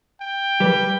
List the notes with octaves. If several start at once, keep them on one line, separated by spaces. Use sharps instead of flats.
G5
G3 B4